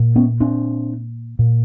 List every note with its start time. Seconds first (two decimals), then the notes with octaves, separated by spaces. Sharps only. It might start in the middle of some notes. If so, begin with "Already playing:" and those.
Already playing: A#2
0.16 B3 C#4
0.40 C4 D4
1.39 A#2